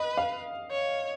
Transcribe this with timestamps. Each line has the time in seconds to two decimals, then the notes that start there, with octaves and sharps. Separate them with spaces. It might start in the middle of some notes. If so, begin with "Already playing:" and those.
Already playing: B4 D#5
0.17 F5
0.71 C#5